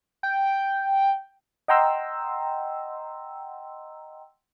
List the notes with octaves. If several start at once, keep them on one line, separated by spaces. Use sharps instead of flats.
G5
D#5 F#5 G5 A#5 C6 E6